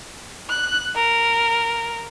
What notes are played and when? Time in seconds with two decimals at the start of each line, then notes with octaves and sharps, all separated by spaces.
0.50 F#6
0.95 A#4